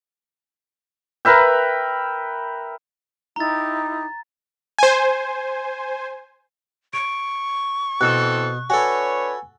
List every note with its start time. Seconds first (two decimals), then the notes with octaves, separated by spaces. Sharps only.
1.25 A#4 B4 E5 G5
3.36 D#4 E4 G4 A#5 A6
4.78 C5 G#5
6.93 C#6 D7
8.01 B2 E3 C4 A4 F#6
8.70 D4 F#4 A4 B4 C#5 G#5